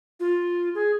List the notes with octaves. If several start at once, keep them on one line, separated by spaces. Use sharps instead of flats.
F4
G#4